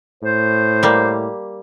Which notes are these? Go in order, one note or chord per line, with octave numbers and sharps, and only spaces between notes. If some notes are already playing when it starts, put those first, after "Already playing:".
A2 C5
G3 A#3